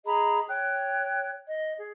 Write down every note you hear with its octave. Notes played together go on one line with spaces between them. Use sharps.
G#4 D#5 A#5 B5
C#5 G5 F#6
D#5
G#4